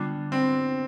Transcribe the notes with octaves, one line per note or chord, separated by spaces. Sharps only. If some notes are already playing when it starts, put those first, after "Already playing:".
Already playing: D3 G3 B3 D4 F4
C4